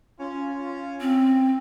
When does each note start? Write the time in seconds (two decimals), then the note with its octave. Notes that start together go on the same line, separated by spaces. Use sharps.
0.19 C#4 F4
1.01 C4